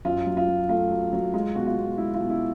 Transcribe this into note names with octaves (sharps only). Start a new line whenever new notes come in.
F#2 F4
F#3
F4
F#3
A3 F4
F#3
F#3
G#3 F4
B2 F#4
F4
B2
G#3 E4
F4
B2
E4